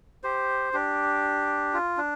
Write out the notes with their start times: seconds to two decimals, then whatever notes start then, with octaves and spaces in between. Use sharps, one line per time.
0.24 G4 C5
0.73 D4 G4
1.74 F4
1.97 D4